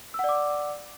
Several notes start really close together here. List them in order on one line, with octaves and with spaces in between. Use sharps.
E6 F#5 D5 D6